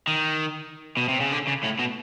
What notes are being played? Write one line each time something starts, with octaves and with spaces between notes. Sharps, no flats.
D#3
B2
C3
C#3
D3
C#3
A2
B2